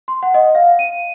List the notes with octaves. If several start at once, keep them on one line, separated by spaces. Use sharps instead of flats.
C6
F#5
D#5
F5
D#7